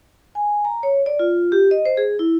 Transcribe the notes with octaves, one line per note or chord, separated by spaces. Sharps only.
G#5
A#5
C#5
D5
F4
G4
D#5
C5
G#4
E4